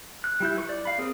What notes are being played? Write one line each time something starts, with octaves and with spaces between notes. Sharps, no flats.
F#6
G3 E4 G6
B4 C#6
D5
F5 B5
C4 G#4 A#4